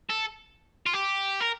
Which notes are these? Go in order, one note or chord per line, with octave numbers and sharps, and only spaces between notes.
A4
F4
G4
A#4